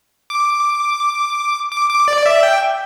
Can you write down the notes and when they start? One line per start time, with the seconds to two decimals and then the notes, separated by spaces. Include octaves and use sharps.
0.30 D6
1.72 D6
1.90 D6
2.08 D5
2.26 E5
2.43 G5